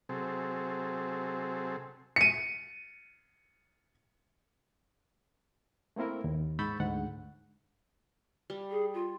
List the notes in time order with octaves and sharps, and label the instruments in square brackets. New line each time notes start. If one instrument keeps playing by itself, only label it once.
[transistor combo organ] C3 F#3 C4 G#4 A4
[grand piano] C#7 D#7
[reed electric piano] A3 A#3 C4 E4 A#4
D#2
G#2 B5 C#6 E6 G6 A6
D2 G#2 F#5
[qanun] G3
[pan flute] G#4
F4